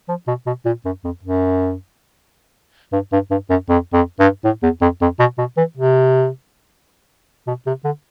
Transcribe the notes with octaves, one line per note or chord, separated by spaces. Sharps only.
F3
B2
B2
A#2
F#2
F2
F#2
G2
G2
G2
F#2
F2
F2
G2
A2
E2
F2
F2
B2
B2
E3
C3
B2
C3
D3